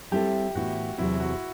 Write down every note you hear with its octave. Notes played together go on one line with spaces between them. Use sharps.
G3 C4 E4 G4 A4
A2 E3 B3 E4 F#4
E2 C3 F#3 C4 E4
F#4